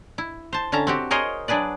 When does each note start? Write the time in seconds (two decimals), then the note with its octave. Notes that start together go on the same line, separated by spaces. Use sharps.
0.18 E4
0.53 C5 A5
0.72 D3 C#4 E5 A5 A#5
0.87 C4 F#4 G4
1.11 G#4 A#4 C5 C#5 D#5
1.48 F#3 D4 G#4 B4 D5